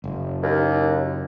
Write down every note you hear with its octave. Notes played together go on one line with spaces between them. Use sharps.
F#1
D#2